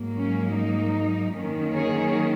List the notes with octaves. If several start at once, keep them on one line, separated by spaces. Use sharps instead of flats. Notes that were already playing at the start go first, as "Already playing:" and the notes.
Already playing: G#2 F#3 A#3
C#4
D#4
F#2 D#3 A#3 C#4
G#4 C#5